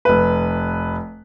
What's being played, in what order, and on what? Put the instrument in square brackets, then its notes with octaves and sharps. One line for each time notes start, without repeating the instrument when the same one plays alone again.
[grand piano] F1 B4